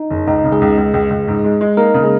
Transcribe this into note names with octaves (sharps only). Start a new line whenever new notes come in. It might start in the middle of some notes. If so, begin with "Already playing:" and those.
Already playing: D#4
F#1
C#2 D#4
C#3
G#3 G#4
C#2
C#2
C#2
C#2
G#2
G#3
G#3
A#3 D#4 A#4
C#3
G#3 G#4